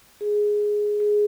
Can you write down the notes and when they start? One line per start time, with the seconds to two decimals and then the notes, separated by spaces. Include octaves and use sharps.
0.21 G#4
1.00 G#4